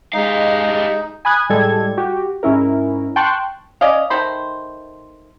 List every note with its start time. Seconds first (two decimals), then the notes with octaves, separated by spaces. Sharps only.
0.14 G3 G#3 D#4 F5
1.25 G#5 B5 D#6 F#6 G#6
1.49 A2 G3 G#3 A4 G#6
1.97 F#4 G4
2.43 G#2 C#4 E4 A#4
3.16 G5 A5 C6 C#6 F#6
3.81 C#4 D5 D#5 F5
4.10 D#3 A3 C5 B5